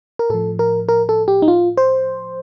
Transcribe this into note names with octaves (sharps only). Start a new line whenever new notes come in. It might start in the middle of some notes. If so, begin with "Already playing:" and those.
A#4
A2 F3 A4
A#4
A#4
A4
G4
D#4
F4
C5